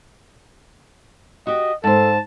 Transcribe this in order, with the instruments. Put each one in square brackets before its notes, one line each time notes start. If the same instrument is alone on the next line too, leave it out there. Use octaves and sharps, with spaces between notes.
[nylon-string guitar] F#4 G4 [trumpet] D#5
[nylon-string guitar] G#2 C5 [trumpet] A4 [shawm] A5